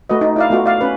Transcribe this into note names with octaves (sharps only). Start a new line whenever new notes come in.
A3 F#4 B4 D#5
D#4
E4 D5 F5
A3 B3 F4 F#4
D5 F5
C#4 B4